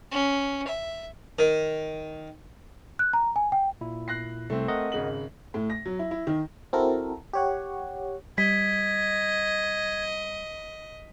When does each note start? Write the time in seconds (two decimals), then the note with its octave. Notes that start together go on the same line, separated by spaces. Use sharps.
0.11 C#4
0.67 E5
1.39 D#3
2.99 F#6
3.13 A#5
3.36 G#5
3.52 G5
3.81 A#2 E4
4.08 F#6 A#6 C7
4.50 C2 A3 C4
4.68 A#4 D#5 F#5
4.92 G#1 C#3 F#7
5.54 A2
5.70 A#6
5.86 F#3
5.99 E4
6.11 E4
6.27 D#3
6.73 C4 E4 F#4 A4 A#4
7.33 G4 C#5 F#5
8.38 G3 D#5 G#6 B6